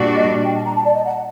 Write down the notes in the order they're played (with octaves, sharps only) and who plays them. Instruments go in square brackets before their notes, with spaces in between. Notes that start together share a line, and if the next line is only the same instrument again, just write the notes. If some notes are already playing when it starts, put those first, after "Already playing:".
Already playing: [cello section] A#2 G3 D4 F#4
[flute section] D#5
G5
A5
A#5
A5
D5
D#5
F#5